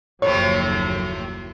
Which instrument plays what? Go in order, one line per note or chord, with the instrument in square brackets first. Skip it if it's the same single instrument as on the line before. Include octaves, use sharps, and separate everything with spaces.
[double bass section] F#1 D#2 F#3 [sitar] A2 C3 F3 [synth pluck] C#5